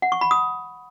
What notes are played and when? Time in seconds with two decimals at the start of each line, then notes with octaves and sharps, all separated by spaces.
0.02 F#5
0.12 C#6
0.21 B5
0.31 D#6